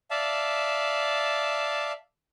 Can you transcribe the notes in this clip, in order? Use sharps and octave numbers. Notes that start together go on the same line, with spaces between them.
D5 E5 F5 A5